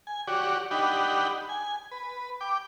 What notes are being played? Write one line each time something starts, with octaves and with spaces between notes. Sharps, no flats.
G#5
F#4 G4 C#5 D5
D4 D#4 G4 F#5 G5 B5
G#5
B4
G5 D6